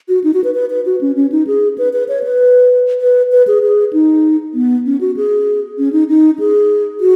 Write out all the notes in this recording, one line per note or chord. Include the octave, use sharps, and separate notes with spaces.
F#4
D#4
F#4
B4
B4
B4
F#4
C#4
C#4
D#4
G#4
B4
B4
C#5
B4
B4
B4
G#4
G#4
D#4
B3
C#4
F#4
G#4
C#4
D#4
D#4
G#4
F#4